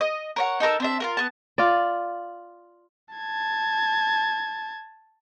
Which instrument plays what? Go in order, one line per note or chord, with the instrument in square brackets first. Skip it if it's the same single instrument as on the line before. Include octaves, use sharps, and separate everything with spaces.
[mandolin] D#5
A#4 C#5 F#5
D#4 A4 A#4 E6
C4 D4 E5
F4 F#4 A#4
B3 A5
[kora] F4 D5
[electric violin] A5 G#6